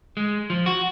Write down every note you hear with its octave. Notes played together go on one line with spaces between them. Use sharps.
G#3
F3
F#4